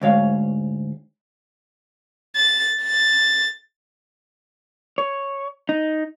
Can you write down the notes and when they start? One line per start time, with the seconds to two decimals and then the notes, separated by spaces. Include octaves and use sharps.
0.01 D2 G#2 C#5 F5
2.35 A6
2.82 A6
4.98 C#5
5.69 D#4